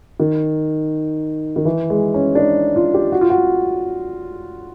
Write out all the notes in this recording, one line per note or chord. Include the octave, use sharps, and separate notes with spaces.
D#3
D#3
E3
G#3
C#4
D4
D#4
F4
G4
F#4
F4
F#4